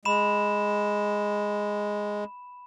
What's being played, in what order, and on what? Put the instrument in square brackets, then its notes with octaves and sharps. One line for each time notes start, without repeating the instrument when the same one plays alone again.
[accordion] G#3 [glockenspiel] B5 E7